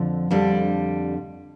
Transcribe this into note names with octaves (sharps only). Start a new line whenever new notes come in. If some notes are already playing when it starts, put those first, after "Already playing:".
Already playing: F2 D3 F3
F2 D3 G3 D4